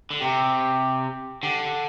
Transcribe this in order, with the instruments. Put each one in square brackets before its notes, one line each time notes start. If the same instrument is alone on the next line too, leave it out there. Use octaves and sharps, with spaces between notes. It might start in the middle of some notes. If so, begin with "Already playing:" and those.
[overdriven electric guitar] D3
[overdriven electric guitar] C3 [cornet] G4
[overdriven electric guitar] D3 [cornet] G4